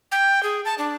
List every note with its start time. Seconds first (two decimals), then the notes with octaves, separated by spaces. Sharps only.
0.12 G5
0.43 G#4
0.65 A5
0.78 D4